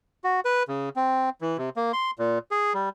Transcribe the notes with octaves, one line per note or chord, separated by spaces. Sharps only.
F#4
B4
C#3
C4
E3
C3
A#3
C6
A#2
G#4
G3